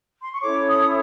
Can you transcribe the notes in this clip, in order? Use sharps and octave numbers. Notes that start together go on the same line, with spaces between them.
C6
C#6
C#4 E4 A4 C#5 D6
D#6